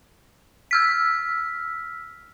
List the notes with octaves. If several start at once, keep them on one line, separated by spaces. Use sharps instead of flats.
E6 F6 B6